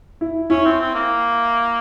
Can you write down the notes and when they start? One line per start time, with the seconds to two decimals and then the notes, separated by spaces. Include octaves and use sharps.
0.21 E4
0.50 C#4 E4
0.65 C4
0.80 C4
0.95 A#3